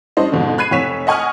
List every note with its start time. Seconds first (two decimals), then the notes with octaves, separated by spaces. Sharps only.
0.17 G3 C#4 D4 C5 D#5
0.32 F2 G#2 B2 D3
0.58 B5 F#6 G#6 C7 D#7
0.71 F1 C#5 B6 E7
1.07 D#5 F#5 G#5 C#6 D#6 F6